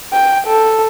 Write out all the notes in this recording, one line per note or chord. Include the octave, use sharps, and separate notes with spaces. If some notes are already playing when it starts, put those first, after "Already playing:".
G5
A4